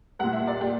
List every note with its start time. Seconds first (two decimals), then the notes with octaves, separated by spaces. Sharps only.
0.19 A#2 G3 F#5
0.33 E5
0.47 D5
0.61 G4